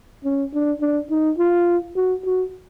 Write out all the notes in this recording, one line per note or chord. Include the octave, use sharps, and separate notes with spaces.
C#4
D4
D4
D#4
F4
F#4
F#4